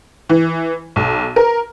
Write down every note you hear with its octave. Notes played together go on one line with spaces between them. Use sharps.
E3
B1
A#4